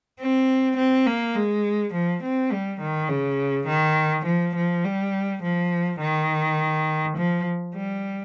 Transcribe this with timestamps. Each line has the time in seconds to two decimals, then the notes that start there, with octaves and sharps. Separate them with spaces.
0.20 C4
0.77 C4
1.06 A#3
1.35 G#3
1.94 F3
2.23 C4
2.52 G3
2.81 D#3
3.09 C#3
3.68 D#3
4.26 F3
4.55 F3
4.85 G3
5.43 F3
6.01 D#3
7.17 F3
7.75 G3